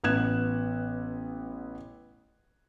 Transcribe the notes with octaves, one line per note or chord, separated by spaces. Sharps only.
A1 B3 F#6 G#6 E7